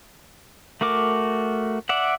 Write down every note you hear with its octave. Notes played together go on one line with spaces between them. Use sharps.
A3 F#4 A#4 D6
D5 E5 F#5